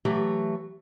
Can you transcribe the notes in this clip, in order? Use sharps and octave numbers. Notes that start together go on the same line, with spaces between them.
E3 F#3 A3 G4